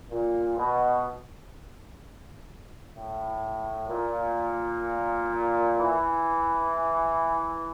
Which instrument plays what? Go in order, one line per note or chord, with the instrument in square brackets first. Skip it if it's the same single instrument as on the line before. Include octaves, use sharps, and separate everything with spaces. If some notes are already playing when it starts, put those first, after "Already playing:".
[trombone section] A#2
B2
A2
A#2
E3